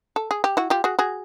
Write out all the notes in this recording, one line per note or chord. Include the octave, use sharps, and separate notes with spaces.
A4
G#4
G4
E4 F#4
F4 G4
F#4 G#4
F#4 G#4